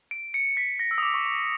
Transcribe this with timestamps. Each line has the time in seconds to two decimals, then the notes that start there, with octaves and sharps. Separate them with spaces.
0.11 D7
0.34 C#7
0.57 B6
0.79 A#6
0.91 E6
0.98 D#6
1.03 D6
1.14 C#6
1.25 C#6